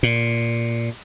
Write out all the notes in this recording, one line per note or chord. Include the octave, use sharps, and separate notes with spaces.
A#2